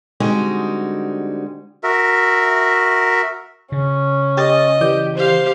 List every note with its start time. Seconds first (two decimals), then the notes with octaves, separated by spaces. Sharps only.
0.20 D3 G3 G#3 C4 D#4 F#4
1.83 F#4 A#4 E5
3.72 C#3 C#4
4.37 G4 D#5 A6
4.81 E3 G4 D5 G6
5.17 G4 C5 F5